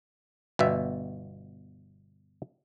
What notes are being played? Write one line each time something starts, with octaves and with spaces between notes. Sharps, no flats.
G1 B2 E5